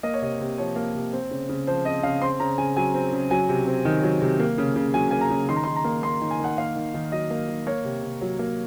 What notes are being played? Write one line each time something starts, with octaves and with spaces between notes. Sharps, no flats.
A#3 D#5
C#5
C3 D#5
C3
F3 C#5
A#3
C3
C4
C#3
C#3
F3 C5
C4 D#5
C#3 F5
C4 C6
C#3 A#5
C#3 G#5
F#3 G#5
C4
C#3
F#3 G#5
C3
C4
D#3
F#3
C3
A#3
C#3
C#3
F#3 G#5
A#3 G#5
A#5
C#3
D#3 C6
A#5
C6
D#3
A#5
A#3
A#3 C6
D#3
G#5
D#3 F#5
A#3 F5
D#3
D#3
F#3 D#5
A#3
D#3
A#3 C#5
C3
C3
F#3
A#3